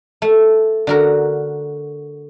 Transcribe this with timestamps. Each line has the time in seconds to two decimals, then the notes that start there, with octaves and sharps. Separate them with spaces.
0.22 A3
0.87 D3 F#4 A#4